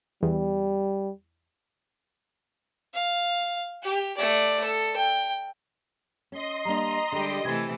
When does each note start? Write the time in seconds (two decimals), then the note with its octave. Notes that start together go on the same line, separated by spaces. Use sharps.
0.23 E2 G3
2.93 F5
3.83 G4
4.17 A3 D5
4.64 A4
4.96 G5
6.32 C#4 D#5 C6
6.65 G3 A#3 D4 A#5
7.12 D3 G3 G#3 G4
7.45 C3 E3 A3 E4 G#6